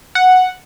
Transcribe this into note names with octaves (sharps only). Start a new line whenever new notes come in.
F#5